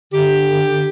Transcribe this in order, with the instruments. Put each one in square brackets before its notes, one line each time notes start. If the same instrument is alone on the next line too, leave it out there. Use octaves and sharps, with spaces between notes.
[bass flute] D3 [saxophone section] G4